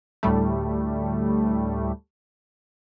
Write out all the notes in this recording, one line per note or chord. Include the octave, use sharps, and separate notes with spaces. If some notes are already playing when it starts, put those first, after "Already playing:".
D2 A2 G3 A3